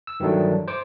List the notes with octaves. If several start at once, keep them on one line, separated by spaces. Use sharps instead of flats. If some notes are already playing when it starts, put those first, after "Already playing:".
E6
G2 D#3 E3 F#3 A3 D4
C5 D6